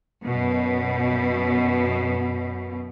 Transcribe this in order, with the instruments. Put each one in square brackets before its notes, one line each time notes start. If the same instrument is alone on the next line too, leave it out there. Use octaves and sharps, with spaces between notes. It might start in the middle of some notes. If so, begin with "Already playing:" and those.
[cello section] F#2 B2